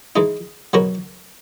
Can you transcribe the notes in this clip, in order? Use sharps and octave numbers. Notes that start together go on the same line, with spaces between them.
E3 G#3 D#4
B2 F#3 B3 F#4 A#4